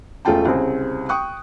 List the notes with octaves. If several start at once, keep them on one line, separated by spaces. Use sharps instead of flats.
E1 A3 C#4 F4 G5 A5
C2 C#3 C4 G#4
G5 C#6 D#6 F#6